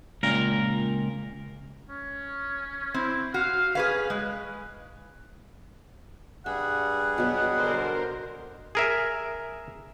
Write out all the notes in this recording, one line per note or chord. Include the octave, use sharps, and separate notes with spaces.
C#2 A#2 A#4
C#4
C4 E4
F#4 F5
C#4 G#4 B4 F5
G#3 B4
G2 G3 G#4 E5 F#5
B2 F#3 B3
D3 A#4 C5
G#4 A#4 E5